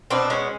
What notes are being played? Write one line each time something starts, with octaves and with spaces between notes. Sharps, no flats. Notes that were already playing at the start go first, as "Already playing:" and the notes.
B2 C4 D4
G#3 C#4